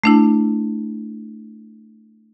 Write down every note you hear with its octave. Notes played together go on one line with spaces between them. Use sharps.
A3 D4 E4